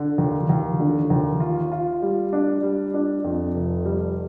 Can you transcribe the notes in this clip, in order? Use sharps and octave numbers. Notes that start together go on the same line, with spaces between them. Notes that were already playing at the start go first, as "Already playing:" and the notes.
Already playing: D3
D#2
D#2
D3
D#2
F4
F4
G3
D4
G3
D4
F2
F1
G3